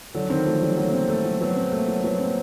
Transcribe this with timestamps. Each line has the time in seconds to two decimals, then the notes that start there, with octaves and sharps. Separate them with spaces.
0.14 D3 F#3
0.30 D#3 C4
0.46 F3 A3
0.62 F#3 G3
0.77 F#3 A#3
0.85 A3
0.92 A#3 C4
1.09 A3
1.25 F#3
1.40 F#3 B3
1.56 C4
1.72 A3 A#3
1.88 F#3
2.04 F#3 B3
2.19 A#3 C4